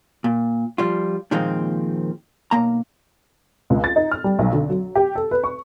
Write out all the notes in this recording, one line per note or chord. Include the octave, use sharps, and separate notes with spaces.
A#2
F3 G3 F4
A#2 D#3 F3 G#3 A#3 C4
B1 A#3 A#5
C#2
A6
D#4
F6
G3
B1
D3
F#3
G4
A4
B4
C#6